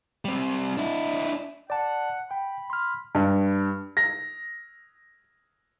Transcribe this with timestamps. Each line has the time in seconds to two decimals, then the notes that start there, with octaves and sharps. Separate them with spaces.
0.25 G3 C4
0.77 D4 E4
1.70 D5 F#5 A5
2.31 G5 B5
2.70 C6 F6
3.15 G2
3.97 A#6